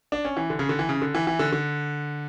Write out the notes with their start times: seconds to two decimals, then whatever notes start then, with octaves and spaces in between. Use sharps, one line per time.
0.12 D4
0.25 C#4
0.37 E3
0.50 D3
0.59 C#3
0.69 D3
0.79 E3
0.89 C#3
1.02 D3
1.15 E3
1.27 E3
1.39 D3
1.52 D3